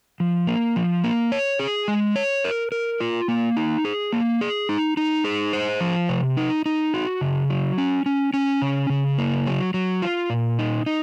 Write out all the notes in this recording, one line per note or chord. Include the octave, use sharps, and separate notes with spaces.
F3
A#3
F3
A#3
C#5
G#4
G#3
C#5
A#4
A#4
F4
A#3
D#4
G#4
A#3
G#4
D#4
D#4
G#4
C5
F3
C3
D#4
D#4
F#4
C#3
F#3
C#4
C#4
C#4
C#3
C#3
A#3
F#3
F#3
F4
A#2
D#4
D#4